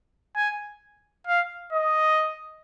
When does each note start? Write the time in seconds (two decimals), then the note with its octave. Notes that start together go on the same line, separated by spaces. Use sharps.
0.36 G#5
1.27 F5
1.73 D#5